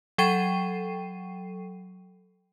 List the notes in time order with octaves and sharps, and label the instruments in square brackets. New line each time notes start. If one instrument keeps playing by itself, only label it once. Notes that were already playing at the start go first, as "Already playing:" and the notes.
[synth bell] F#3 A4 G5 C7 D#7